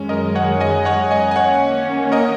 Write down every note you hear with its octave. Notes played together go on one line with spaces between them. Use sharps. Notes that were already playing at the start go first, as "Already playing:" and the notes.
Already playing: F#2 D#3 G#3 C#4
A#4 D#5
C#5 F#5
D#5 G#5
C#5 F#5
D#5 G#5
G#5
D#3 A#3 C#4 C#5 F#5
A#4 D#5